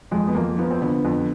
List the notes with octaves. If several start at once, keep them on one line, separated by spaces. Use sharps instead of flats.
F2 G#3
B3
F2 A#3
F3 B3
C4
D3 B3
F2